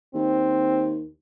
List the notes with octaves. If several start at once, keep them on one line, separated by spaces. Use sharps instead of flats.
D#2 C4